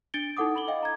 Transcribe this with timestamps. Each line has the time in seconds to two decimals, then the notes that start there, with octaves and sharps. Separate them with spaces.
0.14 D4 A6 C#7 D7 G7
0.37 D#4 E4 A4 F#5 D6 D#6
0.56 B5 F#7 G7
0.68 D#5 F5 G5
0.83 A#5 G#6